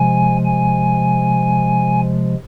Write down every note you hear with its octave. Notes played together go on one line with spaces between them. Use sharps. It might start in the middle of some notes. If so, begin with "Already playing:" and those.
Already playing: C3 F3 G#3 G#5
G#5